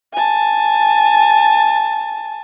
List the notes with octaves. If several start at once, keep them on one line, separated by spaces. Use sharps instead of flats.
G#5 A5